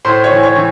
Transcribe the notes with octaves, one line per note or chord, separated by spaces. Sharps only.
A2 C5 C6
C#5 C#6
E3
C#5 C#6
E3